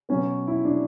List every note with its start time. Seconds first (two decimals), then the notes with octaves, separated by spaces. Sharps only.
0.09 B2 F#3 B3 C#4
0.47 E4
0.65 D4